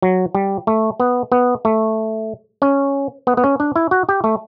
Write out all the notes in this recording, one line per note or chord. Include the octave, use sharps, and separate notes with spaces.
F#3
G3
A3
B3
B3
A3
C#4
B3
B3
C#4
D4
E4
F#4
G4
A3